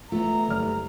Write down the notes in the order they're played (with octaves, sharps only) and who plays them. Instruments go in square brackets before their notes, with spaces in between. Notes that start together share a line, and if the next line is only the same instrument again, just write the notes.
[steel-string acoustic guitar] A3 B3 [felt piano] F4 [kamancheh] A#5
[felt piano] F#1 G3 F6